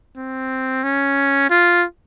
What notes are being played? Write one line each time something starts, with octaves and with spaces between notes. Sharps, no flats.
C4
C#4
F4